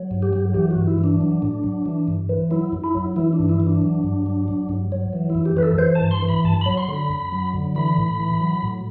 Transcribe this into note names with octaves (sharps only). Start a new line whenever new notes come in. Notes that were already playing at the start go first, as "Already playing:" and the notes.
Already playing: F#3
G2
G4
F#3
E3 G4
F#4
G2
E4
E3
D4
F#3
A2
F#3
E3
G2
E3
F#3 E4
F#2
E4
F#3
E3 E4
D4
G2
E4
E3
D4
F#3
G2
F#3
F#3
G2
F#3
E3
F#2 E4
G4
E3 B4
A4
E3 C5
A5
G2
C6
E3
B5
G2 A5
F#3 B5
C6
D3
B5
F#2
F#3
D3
E3 B5
A2
E3
F#3
A2